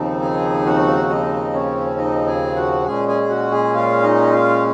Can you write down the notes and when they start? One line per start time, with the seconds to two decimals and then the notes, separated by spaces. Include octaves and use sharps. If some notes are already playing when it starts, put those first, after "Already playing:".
Already playing: D#2 C#3 F3 C4 D#4
0.22 G#4 G#5
0.66 F#4 F#5
1.10 D#4 D#5
1.53 C#4 C#5
1.97 D#4 D#5
2.27 G#4 G#5
2.56 F#4 F#5
2.86 A#2 G#3 C#4 G#4 G#5
3.08 G#4 G#5
3.29 F#4 F#5
3.51 G#4 G#5
3.74 F4 F5
4.03 D#4 D#5
4.33 F4 F5